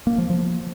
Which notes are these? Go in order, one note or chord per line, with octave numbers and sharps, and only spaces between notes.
A#3
F3
F3